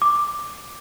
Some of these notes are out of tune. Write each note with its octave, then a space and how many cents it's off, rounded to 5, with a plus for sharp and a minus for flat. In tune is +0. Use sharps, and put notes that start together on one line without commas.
D6 +5